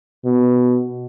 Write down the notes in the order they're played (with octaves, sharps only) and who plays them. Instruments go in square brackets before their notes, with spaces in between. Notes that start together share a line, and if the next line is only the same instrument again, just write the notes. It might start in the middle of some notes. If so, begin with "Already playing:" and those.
[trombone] B2